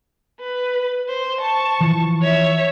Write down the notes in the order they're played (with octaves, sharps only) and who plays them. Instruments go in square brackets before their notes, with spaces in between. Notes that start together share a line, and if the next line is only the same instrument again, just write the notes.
[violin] B4
C5
A5 C#6
[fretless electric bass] E3 F3
[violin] C#5 E5